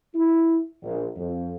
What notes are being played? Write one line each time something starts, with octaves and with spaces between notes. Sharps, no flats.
E4
A#1
F2